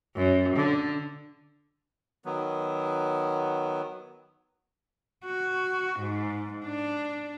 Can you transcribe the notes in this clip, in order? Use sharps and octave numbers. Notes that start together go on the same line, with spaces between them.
F#2
D3
D#3 F#3 B3
F#4
G#2
D4